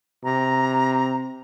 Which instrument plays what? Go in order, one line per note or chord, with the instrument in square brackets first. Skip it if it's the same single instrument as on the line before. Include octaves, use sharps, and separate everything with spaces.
[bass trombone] C3 [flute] A#5